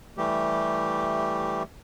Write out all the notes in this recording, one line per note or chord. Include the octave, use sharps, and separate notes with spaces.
E3 G3 A3 G4